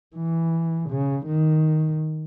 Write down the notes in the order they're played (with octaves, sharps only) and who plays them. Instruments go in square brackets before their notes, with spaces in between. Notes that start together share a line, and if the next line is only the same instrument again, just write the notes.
[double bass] E3
C#3
D#3